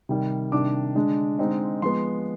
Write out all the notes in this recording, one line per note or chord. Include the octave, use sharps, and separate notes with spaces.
C3 D#3 G3
C3 D#3 G3 D4 D6
D3 G#3 D4
D3 G#3 C4 D#4
F3 G#3 B3 C6